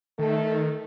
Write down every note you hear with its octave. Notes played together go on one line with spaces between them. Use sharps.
D#3 A3 A4